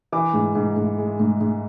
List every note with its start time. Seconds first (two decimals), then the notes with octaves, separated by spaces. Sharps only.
0.12 E3 D6
0.34 G#2
0.55 G#2
0.76 G#2
0.98 G#3
1.20 G#2
1.41 G#2